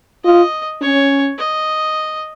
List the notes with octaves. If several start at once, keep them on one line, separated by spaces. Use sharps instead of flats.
F4 D#5
C#4 C#5
D#5